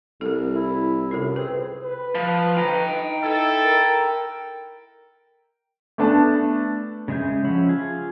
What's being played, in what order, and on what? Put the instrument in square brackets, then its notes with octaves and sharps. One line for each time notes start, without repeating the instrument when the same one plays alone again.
[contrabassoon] C2 [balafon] A4 A#4
[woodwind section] E4
[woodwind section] F#2 C3 [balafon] F4 A4 A#4
[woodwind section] C4 G#4 [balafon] B4
[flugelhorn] B4
[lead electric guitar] F3
G5 A#5
[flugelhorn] D#4
[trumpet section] E4 A4
[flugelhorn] A#4
[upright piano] A3 B3 D4 A5
[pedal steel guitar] C#3 G#3 G#4 E5 G6
F3 C#4 E5 F#5 B5
F4 G#4